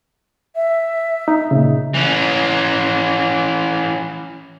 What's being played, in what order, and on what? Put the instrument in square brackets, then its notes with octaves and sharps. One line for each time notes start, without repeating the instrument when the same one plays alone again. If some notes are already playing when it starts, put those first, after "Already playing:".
[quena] E5
[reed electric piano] D#4
A#2 C#3
[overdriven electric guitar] E3 C#4